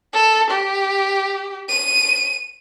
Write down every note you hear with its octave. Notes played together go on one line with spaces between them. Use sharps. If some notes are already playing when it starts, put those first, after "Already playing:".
A4
G4
D#7